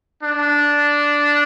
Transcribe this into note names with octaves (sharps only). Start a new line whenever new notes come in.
D4